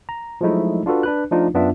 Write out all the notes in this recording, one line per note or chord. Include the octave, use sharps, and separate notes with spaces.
A#5
F3 F#3 G#3 A3 D#4 E4
D4 F4 F#4 A4 B4
D4 B4 F#6
F3 A3 D4 D#4 F4
F#2 B3 D4 F4 E5